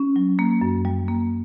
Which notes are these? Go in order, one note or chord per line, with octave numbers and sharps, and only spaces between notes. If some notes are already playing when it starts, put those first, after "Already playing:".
Already playing: C#4
F#3
A#3
F#2
G3
A#3